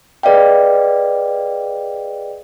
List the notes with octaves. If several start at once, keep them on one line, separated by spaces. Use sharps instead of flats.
G#4 B4 D5 D#5 F5 G5